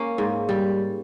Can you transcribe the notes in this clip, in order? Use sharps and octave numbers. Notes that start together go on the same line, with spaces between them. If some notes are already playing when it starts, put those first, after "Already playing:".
Already playing: A#3 C#4
G#2
G3